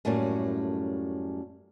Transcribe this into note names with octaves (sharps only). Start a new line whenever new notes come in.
F#2 A2 G3 A3 A#3 C#4